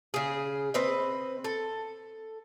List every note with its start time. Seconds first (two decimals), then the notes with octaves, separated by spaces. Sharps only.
0.14 C#3 G#4
0.74 C4 B4 D#5
1.44 A4